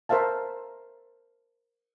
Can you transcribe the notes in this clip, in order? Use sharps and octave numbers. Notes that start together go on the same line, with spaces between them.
A#4 C5 E5 F5 A5